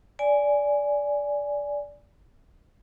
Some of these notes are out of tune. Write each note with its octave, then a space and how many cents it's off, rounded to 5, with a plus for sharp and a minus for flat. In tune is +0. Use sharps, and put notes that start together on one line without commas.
D5 -15 G#5 +0